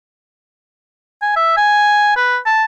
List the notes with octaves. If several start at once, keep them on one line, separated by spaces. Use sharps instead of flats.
G#5
E5
G#5
B4
A5